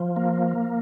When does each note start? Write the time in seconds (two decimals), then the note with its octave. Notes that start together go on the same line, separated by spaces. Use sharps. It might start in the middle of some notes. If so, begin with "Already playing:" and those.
Already playing: F3
0.16 A#3